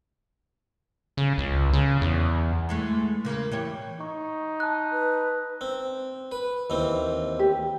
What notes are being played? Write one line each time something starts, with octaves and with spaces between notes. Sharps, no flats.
C#3
C#2
C#3
E2
E3 G#3 A3
C#3 A#3
E3 G4 C#5
D#4 C#6
A5 F#6
B4
C4
B4
D#2 E3 C4
G4